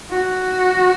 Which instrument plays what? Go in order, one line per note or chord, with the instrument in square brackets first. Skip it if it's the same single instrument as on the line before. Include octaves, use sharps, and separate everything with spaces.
[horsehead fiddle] F#4